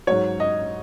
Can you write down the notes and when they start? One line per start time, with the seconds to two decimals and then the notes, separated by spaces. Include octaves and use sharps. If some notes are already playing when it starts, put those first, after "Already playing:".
0.07 G#2 F#3 C#5
0.40 D#5